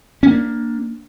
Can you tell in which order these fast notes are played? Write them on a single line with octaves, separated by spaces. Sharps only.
C#4 A#3 D4